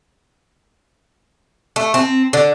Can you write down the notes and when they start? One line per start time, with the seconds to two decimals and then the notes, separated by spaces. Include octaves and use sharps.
1.76 A3
1.94 C4
2.33 D3